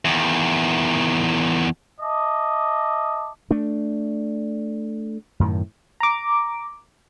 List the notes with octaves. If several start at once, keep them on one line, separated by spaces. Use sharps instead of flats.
E2 D#3
D#5 E5 A5 D6
A3 D4
F#2 A2 D#3
A#5 D6